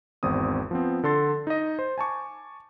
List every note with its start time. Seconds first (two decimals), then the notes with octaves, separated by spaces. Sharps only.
0.23 G#1 E2 C4 D#6
0.71 F3 B3 C4
1.03 D3 A4 C6 A6
1.47 D#4 D#5
1.79 C5
1.98 G#5 A5 C#6 D6